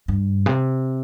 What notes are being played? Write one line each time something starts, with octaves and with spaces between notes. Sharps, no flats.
G2
C3